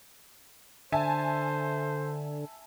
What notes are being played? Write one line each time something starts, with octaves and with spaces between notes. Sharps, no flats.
D3 C5 E5 G#5 A5